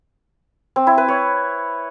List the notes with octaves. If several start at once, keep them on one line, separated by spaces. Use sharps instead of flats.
C4
E4
B4
C#5